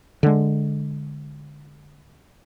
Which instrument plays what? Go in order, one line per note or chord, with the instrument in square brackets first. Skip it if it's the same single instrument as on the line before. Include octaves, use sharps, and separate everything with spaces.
[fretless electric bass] D3 G#3